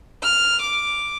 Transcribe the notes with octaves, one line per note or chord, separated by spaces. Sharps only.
F6
D6